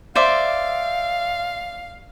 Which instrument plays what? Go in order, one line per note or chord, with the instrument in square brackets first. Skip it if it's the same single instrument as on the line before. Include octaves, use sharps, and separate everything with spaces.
[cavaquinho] C5 D5 E5 [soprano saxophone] F5